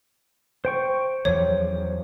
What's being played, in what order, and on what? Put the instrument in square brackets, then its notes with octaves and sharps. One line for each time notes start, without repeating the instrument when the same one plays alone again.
[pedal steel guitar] C5 G5 C#6
[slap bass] E2 F3 F#3 [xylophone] C#5